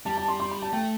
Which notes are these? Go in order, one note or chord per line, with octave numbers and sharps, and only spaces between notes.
G3 A5
A5
C6
C6
B5
A5
A3 G5